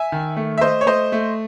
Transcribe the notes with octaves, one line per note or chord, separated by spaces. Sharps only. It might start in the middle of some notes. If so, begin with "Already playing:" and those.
Already playing: E5 G#5
D#3
A3
E5
A3 C5 D#5
C#5
A3 C5 D#5
A3